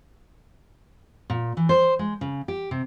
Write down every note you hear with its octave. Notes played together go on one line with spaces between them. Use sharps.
A#2
E3
C5
G#3
C#3
G4
C3